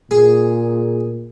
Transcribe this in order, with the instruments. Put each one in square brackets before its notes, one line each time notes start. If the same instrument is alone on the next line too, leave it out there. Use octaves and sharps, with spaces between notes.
[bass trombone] A#2 [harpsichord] G#4